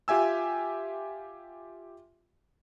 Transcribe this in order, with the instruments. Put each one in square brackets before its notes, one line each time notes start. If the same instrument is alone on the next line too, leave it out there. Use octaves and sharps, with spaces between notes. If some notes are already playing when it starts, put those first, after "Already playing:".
[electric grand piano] F4 G4 E5 G#5 E6